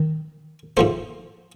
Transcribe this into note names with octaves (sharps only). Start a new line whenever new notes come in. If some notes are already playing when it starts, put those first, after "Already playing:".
Already playing: D#3
G#2 F3 A3 C5